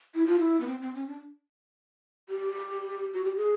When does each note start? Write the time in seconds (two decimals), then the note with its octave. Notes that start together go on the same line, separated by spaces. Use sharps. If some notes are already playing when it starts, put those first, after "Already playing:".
0.15 E4
0.26 F4
0.39 E4
0.60 B3
0.67 C4
0.82 C4
0.95 C#4
1.07 D4
2.29 G4
3.14 F#4
3.25 G4
3.36 G#4